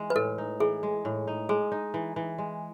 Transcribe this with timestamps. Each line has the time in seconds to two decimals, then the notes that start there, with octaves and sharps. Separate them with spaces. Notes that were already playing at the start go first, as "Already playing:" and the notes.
Already playing: E3 G#3
0.10 B4
0.16 A2 A4
0.38 D#4
0.60 E3 G#4
0.83 G#3
1.05 A2
1.27 D#4
1.49 G#3 G#4
1.72 D#4
1.94 E3
2.16 E3
2.38 G#3